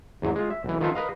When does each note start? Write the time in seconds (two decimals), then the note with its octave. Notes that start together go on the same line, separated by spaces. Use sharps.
0.22 E2 G#2 F#3
0.36 G#3 F4
0.50 E5
0.64 B1 E3
0.81 D#3 F3 F4 A4 B4
0.95 A#4 B4 D#5 F5